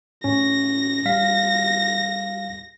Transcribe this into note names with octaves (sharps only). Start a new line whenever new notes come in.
A2 C#4 A#6
G3 F5 B6